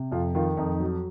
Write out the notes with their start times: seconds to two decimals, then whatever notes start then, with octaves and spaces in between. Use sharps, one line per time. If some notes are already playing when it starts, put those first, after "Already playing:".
Already playing: C3
0.12 F2 F4
0.35 D#3 F4
0.57 F2 D#4
0.80 F#3